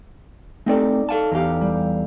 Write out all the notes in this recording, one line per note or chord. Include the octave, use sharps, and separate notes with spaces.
A3 C4 D#4 G4 A4 D5
A4 F5 A5
E2 G4 A4 F5 A#5
G3